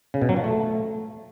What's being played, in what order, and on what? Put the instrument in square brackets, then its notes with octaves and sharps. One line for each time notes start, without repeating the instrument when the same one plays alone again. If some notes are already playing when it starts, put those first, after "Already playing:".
[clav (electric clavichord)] C#3
B2
F#3
F3
A3